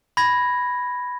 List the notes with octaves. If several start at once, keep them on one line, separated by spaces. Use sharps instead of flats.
B5 G#6 A#6